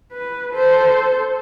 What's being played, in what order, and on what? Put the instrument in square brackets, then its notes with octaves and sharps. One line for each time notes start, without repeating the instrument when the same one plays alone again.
[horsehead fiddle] B4
A4 C5